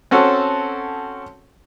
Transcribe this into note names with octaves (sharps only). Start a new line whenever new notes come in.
C4 C#4 F#4 A4